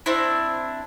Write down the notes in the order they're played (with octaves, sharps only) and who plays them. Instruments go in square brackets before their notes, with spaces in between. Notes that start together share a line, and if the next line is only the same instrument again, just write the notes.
[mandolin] C4 D4 E4